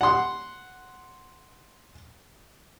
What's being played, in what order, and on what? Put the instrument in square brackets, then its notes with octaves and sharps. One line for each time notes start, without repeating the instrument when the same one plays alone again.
[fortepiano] F#5 C6